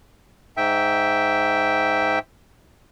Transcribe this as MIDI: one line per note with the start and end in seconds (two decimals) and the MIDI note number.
0.57 2.19 44
0.57 2.19 76
0.57 2.19 79